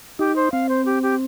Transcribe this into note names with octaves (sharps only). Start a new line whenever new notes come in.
D#4 G4
C5
C4 F5
C5
G4
G4